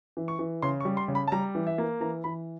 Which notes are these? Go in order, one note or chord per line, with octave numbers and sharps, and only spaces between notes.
E3
C#6
E3
C#3 C6
C#6
G3
C6
C#3
B5
A5
G3 A#5
E3
E5
A#3
E3 A#5
E3 B5